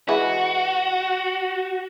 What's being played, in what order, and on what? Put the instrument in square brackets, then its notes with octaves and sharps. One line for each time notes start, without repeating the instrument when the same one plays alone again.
[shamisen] E3 G#3 B4 [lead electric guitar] F#4